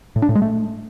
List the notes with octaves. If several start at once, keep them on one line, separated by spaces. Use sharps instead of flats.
A2
D4
A2
G#3
A3